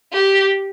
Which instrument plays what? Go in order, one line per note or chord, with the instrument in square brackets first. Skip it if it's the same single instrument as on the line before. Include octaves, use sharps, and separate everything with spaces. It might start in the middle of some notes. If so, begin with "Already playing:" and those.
[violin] G4